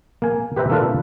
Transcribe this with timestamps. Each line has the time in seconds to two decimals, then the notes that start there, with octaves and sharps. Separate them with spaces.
0.22 A#3 G#5
0.56 G4 B4 C5 E5 A#5
0.70 A3 A#3 D4 F4 A4 B4